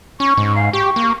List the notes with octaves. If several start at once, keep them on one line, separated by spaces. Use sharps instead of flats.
C#4 C#6
G#2
F5
G4 C#6
A#3